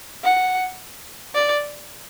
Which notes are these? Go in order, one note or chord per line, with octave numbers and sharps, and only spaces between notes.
F#5
D5